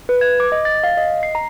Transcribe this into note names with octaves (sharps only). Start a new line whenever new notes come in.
B4
G#6
D6
D#5
A6
F5
D#5
C7
A#5